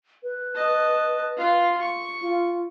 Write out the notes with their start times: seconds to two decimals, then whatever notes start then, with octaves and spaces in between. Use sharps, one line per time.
0.23 B4
0.55 D#5 A5
1.37 F4 F5
1.82 C#6
2.21 F4